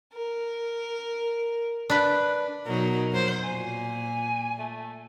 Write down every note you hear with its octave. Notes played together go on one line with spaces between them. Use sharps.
A#4
D4 B4
B2 F#3 D#4 A#4
F2 F#3 C5
A#2 G#5
A3